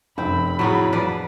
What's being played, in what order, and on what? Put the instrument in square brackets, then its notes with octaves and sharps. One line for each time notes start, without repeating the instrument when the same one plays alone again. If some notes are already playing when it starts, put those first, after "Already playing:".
[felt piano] F1 [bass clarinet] F#2 [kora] C4 [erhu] B5
[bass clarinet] A2 [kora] F#3 B3 G#4
[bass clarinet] E3 [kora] F3 B4 D5